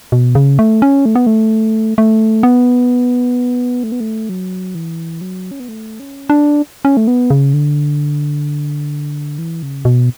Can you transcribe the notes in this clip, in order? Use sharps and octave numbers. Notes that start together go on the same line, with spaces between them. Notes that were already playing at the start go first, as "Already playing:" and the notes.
B2
C#3
A3
C#4
A3
B3
A3
A3
B3
A3
B3
A3
F#3
E3
F#3
C#4
B3
A3
C#4
D4
C#4
A3
B3
C#3
D3
E3
C#3
B2